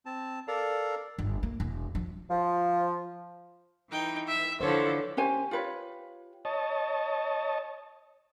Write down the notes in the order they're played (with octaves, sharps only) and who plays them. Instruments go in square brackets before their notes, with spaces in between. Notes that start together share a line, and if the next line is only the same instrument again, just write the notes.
[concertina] C4 A5
A4 A#4 D5 F5 A#5
[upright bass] G1
A#3
E1
F3
[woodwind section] F3
[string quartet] E3 [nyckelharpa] D#4 G5
[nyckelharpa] E5
[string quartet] D3 E3 F3 [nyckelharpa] A4 [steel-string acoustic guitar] C5 C#5
[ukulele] C#4 G4 C5 G#5
F4 G4 B4 C#5
[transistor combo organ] C#5 D#5 A5